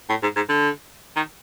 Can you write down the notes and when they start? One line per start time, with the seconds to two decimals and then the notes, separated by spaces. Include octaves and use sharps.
0.09 A2
0.23 G#2
0.36 G#2
0.49 D3
1.16 D#3